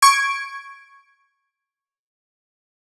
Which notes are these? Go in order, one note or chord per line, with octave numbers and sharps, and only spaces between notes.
C#6 G#6 D7